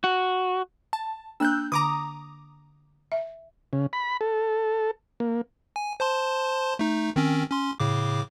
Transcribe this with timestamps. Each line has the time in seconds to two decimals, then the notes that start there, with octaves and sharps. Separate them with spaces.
0.04 F#4
0.93 A5
1.40 A#3 D4 E6 F#6 G6
1.72 D3 A#5 B5 D6 D#6
3.12 E5
3.73 C#3
3.93 B5
4.21 A4
5.20 A#3
5.76 G#5
6.00 C5 A5 C6
6.79 A3 D#4
7.16 D#3 C4 C#4
7.50 C#4 C6
7.80 A2 C#3 D6